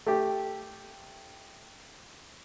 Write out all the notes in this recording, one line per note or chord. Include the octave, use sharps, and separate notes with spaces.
A3 G4